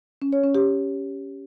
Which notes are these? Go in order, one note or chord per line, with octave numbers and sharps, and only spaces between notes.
C#4
C#5
C#4
G4